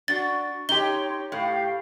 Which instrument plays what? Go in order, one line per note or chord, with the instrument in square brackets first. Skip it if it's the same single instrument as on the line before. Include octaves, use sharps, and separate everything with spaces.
[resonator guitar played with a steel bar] D4 F#4 [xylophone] A6
[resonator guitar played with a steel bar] D#4 G4 [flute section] C#5 C6 [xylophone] G7
[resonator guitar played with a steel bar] A2 [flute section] G4 F5